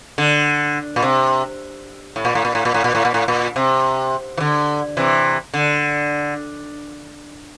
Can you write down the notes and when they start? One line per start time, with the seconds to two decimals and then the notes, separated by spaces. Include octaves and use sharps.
0.18 D3
0.96 A#2
1.02 C3
2.16 A2
2.25 A#2
2.35 A2
2.45 A#2
2.55 A2
2.65 A#2
2.74 A2
2.84 A#2
2.95 A2
3.05 A#2
3.14 A2
3.28 A#2
3.56 C3
4.37 E3
4.40 D3
4.97 C3 E3
5.54 D3